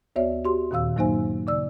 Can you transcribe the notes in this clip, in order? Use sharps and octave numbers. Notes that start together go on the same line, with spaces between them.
D2 B3 F#4 C#5 D5 E5
F#4 G4 C6
D#2 A#2 D#3 F5 E6
G2 F#3 A#3 D#4 C5 G#5
C#3 D5 E6